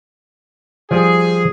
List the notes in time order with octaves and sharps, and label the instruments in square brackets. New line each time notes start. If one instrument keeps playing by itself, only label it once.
[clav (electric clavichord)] F3 G3 [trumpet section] G#4